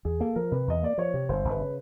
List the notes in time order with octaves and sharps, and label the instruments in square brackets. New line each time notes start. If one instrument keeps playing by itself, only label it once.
[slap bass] E2 [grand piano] G#4
[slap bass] A#3 [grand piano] A4
[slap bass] F3 [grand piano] A#4
[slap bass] C3 [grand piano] B4
[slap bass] E2 [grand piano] D#5
[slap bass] A#3 [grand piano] D5
[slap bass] F3 [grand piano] C#5
[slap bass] C3
[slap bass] G1 [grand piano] C5
[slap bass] G1
[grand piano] B4
[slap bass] C#3